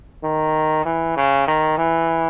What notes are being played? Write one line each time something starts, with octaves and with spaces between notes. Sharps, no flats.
D#3
E3
C#3
D#3
E3